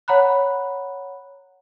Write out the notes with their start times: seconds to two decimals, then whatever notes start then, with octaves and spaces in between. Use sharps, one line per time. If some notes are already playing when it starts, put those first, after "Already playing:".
0.08 C#5 F#5 A#5 B5 F#6